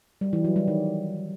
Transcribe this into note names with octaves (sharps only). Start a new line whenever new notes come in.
G3
E3
F#3
G3
D#3